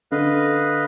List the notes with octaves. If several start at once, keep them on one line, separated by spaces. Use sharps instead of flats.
D3 B4 D#5 F5